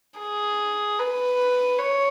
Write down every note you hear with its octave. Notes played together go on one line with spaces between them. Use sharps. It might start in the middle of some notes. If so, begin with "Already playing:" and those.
G#4
B4
C#5